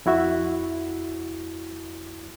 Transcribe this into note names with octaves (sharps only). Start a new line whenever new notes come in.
F2 E4 F#4 E5